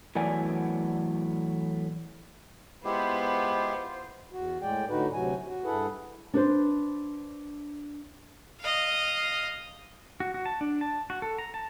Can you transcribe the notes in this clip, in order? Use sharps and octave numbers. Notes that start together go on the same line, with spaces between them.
A2 E3 F#3 B3 D5 G#5
G#3 B3 E4 F4 G4 C5
E2 F#4
A2 G#3 D5 G5
A2 D3 D#4 F#4 B4
D2 C3 F#3 F#4 G#5
F#4
G2 E4 G#4 A4 B4 F#5
D4 B4 C5
D#5 F5
F#4
F#4
A5
D4
A5
F#4
A4
A#5
A5